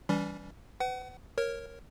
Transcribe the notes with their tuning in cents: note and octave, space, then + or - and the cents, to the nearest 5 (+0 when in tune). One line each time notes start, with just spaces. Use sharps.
E3 +0 G3 +0 C#4 +45
B4 +40 F#5 +30
A#4 +0 C#5 -15